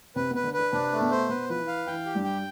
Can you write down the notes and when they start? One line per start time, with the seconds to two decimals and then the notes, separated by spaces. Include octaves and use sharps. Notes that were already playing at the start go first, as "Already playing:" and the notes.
0.16 C3 C4 B4
0.30 B2 B3 B4
0.44 D3 D4
0.53 B4
0.59 D3 D4
0.73 C3 C4 D4
0.92 A3
1.01 B2 B3
1.11 C5
1.29 B2 B3 B4
1.49 F3 B4
1.59 E3
1.67 F5
1.87 E3 G5
2.06 G4
2.15 G2 G3
2.24 G5